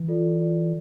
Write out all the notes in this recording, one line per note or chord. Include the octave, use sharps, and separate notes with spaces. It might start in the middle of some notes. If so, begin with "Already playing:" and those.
Already playing: E3
F4 A4 D5
F4 A4 D5